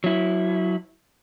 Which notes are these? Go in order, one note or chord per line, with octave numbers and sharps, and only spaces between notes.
F#3 E4